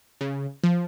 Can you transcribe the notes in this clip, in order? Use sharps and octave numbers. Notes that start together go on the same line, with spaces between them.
C#3
F3